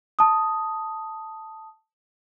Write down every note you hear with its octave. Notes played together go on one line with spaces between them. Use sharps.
A5 D#6